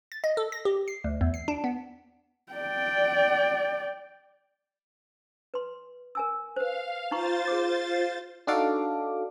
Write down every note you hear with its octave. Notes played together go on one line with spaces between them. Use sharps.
A6
D#5
A4
A#6
G4
C7
D2
E2
C7
D4
B3
D5 G5
B4 C6
A#4 G#5 E6
B4 C5 F5
D#4 F4 C5 A#5 C#6 A6
G#4 D6
D4 D#4 F#4 A4 F5 D6